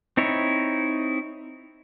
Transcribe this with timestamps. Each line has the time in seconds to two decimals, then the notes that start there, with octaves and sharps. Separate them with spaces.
0.17 C4 D#4 E4 C#5